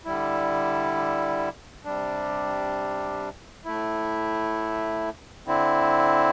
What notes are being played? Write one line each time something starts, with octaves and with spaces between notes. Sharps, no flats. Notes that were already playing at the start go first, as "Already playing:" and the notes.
D3 G3 E4
C3 G3 D4
A2 A3 E4
D3 C4 E4